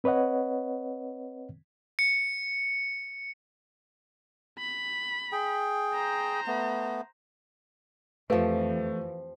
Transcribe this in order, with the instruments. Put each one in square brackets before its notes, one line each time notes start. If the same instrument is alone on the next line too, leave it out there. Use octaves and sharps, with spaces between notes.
[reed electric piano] C4 B4 C#5 D#5 F#5
[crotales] C#7
[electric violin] B5
[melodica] G#4 G5
[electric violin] C5 A#5
[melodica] A3 B3
[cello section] F2 E3 [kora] F3 G4 [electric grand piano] A3 [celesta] B4 F5